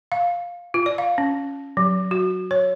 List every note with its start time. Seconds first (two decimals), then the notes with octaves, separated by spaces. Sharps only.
0.12 F5
0.74 F4
0.86 D5
0.98 F5
1.18 C#4
1.77 F#3
2.11 F#4
2.51 C#5